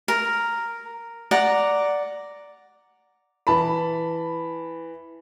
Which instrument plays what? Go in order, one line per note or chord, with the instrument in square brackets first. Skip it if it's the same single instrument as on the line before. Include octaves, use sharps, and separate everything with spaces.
[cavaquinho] A#4
D5 F#5 A#5
[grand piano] E3 A5 B5